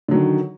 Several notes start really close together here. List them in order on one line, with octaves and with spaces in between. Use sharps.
D3 F#3 D#3